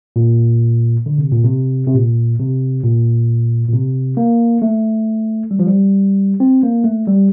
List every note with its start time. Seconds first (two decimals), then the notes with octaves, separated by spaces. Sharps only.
0.16 A#2
1.06 D3
1.18 C3
1.31 A#2
1.45 C3
1.87 C3
1.94 A#2
2.39 C3
2.84 A#2
3.69 A#2
3.73 C3
4.17 A#3
4.62 A3
5.51 G3
5.59 F3
5.67 G3
6.40 C4
6.63 A#3
6.84 A3
7.07 G3